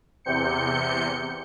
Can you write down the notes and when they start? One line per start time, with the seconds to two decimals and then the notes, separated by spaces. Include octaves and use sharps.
0.25 E2 C3 G6 C#7